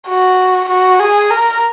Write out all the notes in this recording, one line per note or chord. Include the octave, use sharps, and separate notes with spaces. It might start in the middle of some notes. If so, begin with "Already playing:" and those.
F#4
F#4
G#4
A#4